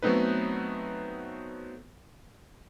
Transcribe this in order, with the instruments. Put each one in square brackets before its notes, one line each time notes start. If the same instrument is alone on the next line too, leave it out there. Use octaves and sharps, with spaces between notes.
[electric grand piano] F#3 A3 B3 C4 D#4 B4